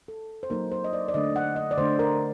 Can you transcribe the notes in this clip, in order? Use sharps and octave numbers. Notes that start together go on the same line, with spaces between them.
A4
C5
F#3 A#3 D#4 A#4
C5
D#5
D5
D5
D3 A3 D4 D#5
F#5
D#5
D5
D3 A3 D4 C5
A#4